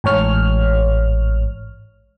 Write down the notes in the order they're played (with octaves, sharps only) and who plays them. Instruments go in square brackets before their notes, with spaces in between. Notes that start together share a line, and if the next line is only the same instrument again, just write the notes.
[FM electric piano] A1 G#2 C#5 F6